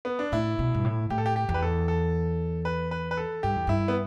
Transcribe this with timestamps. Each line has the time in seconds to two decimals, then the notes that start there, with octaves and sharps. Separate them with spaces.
0.05 B3
0.19 D4
0.32 A2 E4
0.59 B2
0.74 G2
0.85 A2
1.10 A2 G4
1.18 A4
1.26 G4
1.36 G4
1.49 E2
1.54 B4
1.62 A4
1.88 A4
2.65 B4
2.91 B4
3.11 B4
3.17 A4
3.43 G2 G4
3.56 E2
3.67 G2 E4
3.88 B3